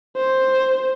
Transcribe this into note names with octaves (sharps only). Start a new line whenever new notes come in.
C5